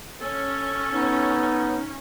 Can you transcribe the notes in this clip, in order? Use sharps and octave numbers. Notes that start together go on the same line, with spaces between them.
C#4 A4
B3 D#4